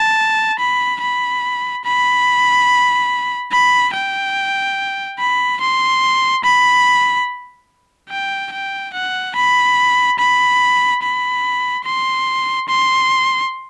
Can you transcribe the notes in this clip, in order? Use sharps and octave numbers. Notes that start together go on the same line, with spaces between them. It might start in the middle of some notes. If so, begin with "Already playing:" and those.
Already playing: A5
B5
B5
B5
B5
G5
B5
C6
B5
G5
G5
F#5
B5
B5
B5
C6
C6